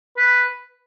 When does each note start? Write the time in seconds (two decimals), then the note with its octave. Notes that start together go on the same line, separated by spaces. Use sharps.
0.17 B4